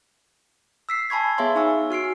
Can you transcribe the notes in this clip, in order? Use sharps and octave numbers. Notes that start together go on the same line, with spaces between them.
E6 B6 C7
G#5 A5 B5 C#6 G#6
B3 G#4 C#5 E5 F5 C6
D#4 G#5 C#6 E6
F#4 F6 C7 D7